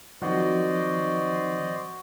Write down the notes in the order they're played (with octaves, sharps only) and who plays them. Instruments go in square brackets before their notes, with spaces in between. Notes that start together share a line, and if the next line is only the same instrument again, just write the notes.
[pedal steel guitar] D#3 [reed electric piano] F3 F#3 C4 [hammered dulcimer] F#4 [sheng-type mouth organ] C5 D5 D#5